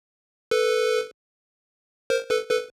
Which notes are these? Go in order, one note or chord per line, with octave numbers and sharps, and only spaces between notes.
A4 B4
A#4 C5
A4 B4
A4 B4